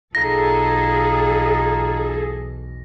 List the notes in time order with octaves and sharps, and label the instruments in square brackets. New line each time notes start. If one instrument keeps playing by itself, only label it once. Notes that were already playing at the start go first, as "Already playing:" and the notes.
[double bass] B1 E2 [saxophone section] D#4 F4 [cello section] G#4 A4 [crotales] A#6